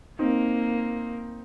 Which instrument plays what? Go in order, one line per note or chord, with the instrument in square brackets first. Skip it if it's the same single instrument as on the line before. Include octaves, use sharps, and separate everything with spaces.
[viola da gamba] A#3 [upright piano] C4 D#4